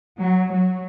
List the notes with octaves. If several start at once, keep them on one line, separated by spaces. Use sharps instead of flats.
F#3
F#3